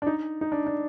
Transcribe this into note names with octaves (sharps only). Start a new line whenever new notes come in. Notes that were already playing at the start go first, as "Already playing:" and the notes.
D4
D#4
D#4
D4
D4